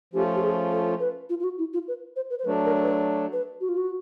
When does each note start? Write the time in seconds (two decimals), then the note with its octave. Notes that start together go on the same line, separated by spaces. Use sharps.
0.13 F3 A3 C#4 F4 G4
0.35 G4
0.42 G#4
0.71 A4
1.00 B4
1.29 F4
1.40 F4
1.44 F#4
1.58 E4
1.73 F4
1.88 B4
2.16 C5
2.30 B4
2.39 C5
2.45 F#3 A3 D4 B4
2.65 A#4
2.83 B4
3.33 B4
3.61 F#4
3.69 F4
3.77 F#4